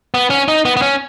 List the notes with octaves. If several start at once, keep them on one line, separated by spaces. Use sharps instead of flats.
B3
C#4
D#4
B3
B3
C#4